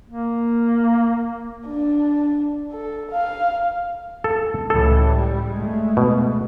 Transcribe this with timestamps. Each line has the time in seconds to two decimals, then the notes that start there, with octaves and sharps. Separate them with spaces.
0.08 A#3
1.67 D4
2.72 A4
3.11 F5
4.24 A4
4.70 C#2 A2 E3 A4
5.08 G3
5.51 G#3 A3
5.97 B2